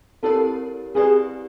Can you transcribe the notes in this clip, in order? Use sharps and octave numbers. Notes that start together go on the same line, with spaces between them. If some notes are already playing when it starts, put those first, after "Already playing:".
C4 E4 G4 A4 A#4 C#5
C4 E4 G4 G#4 B4 D5